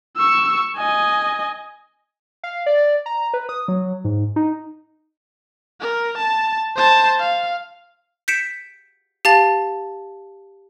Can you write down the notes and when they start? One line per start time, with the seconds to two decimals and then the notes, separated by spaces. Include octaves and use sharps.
0.17 C#6 E6
0.77 D#5 G#5
2.43 F5
2.66 D5
3.06 A#5
3.34 B4
3.49 D#6
3.68 F#3
4.05 G#2
4.36 D#4
5.80 A#4
6.17 A5
6.76 C5 A5
7.19 F5
8.28 G6 B6 C#7 D7 E7
9.25 G4 F5 A5 A6 F7